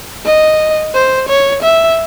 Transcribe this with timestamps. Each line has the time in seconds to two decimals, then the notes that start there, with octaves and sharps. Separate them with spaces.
0.25 D#5
0.94 C5
1.29 C#5
1.63 E5